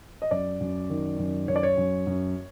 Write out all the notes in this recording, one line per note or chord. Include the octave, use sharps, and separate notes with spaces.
D#5
F#2 D5
F#2
D#3
F#2
F#2 C#5
D5
C#5
F#2
F#2